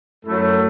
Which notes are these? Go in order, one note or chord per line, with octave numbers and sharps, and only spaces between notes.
F#2 F#3 A3 E4 A4